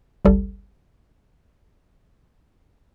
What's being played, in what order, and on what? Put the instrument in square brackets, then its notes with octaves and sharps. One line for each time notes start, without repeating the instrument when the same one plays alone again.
[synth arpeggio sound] G1 C#2 G3 A4